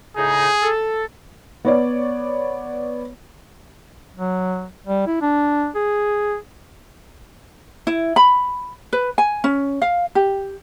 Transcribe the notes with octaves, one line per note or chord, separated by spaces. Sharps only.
A2 C#3 D#4 G#4
A4
B3 C#5 D5
F#3
G3
E4
D4
G#4
E4
B5
B4
G#5
C#4
F5
G4